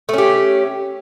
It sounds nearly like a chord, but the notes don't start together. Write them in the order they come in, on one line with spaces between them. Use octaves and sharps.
A3 C#4 G4